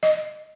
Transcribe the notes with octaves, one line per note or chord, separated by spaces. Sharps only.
D#5